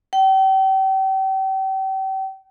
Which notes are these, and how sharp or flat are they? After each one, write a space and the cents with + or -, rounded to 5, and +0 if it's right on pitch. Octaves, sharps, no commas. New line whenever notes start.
G5 -35